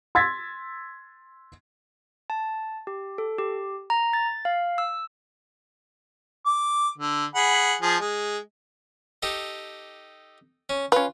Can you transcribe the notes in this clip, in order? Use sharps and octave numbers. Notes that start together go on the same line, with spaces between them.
C6 E6 G#6 A6 B6
A5
G4
A4
G4
A#5
A6
F5
E6
D6
D3
G#4 F#5 B5
F3 G#4
G#3
D#4 G4 A4
C#4
C#4 F4 B4